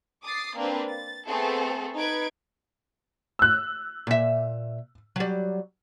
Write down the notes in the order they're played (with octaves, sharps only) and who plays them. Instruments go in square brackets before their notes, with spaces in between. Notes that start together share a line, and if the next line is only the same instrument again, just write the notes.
[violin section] D6 D#6 A6 C7
A#3 C4 D4 B4
A6
A3 B3 C4 G#4 A4
D#4 B4 G#6 D7
[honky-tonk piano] E6 F#6
[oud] A#2 E5
F#3 G3